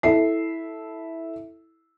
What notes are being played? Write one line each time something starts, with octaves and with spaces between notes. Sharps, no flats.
E4 A4 E5 C7